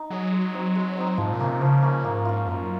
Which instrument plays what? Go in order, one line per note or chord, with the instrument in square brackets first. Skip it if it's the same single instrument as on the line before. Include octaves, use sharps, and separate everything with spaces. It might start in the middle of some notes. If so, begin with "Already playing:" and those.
Already playing: [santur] D#4
[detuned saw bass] F#3 [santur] G#4 D#5
[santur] G#3
C4 D#4
G#3
C4 D#4
[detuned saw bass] G#2 [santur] F3
[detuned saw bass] A#2
[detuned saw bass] C#3 [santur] A#3 C#4
[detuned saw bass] C3
[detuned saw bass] C#3 [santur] F3
[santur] A#3 C#4
[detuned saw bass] G#2 [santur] A#3
[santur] C#4 F4
[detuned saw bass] F#2 [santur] A#3